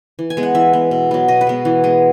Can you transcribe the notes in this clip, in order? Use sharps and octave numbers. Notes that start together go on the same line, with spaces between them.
E3
G#5
G#3 B3
F#5
E3 E5
B3
B2
F#3 B3
B2 D#5
B4
G#3 B3
E3
G#3 B3